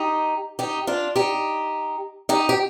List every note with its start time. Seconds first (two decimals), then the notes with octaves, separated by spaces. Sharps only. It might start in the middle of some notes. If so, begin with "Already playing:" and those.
Already playing: D#4 G4
0.59 D#4 G4
0.87 D4 F4
1.16 D#4 G4
2.29 D#4 G4
2.49 G4